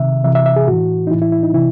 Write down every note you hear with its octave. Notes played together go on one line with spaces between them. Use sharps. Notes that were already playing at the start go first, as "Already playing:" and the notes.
Already playing: C3 D#3 E5
C3 E3 E5
E5
E5
G#4
A2 E3 F#4
D#4
A2 E3 E4
E4
E4
D#4
C3 E3 E4